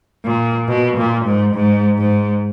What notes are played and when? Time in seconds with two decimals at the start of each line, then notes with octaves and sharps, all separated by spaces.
0.25 A#2
0.68 B2
0.97 A#2
1.26 G#2
1.55 G#2
1.98 G#2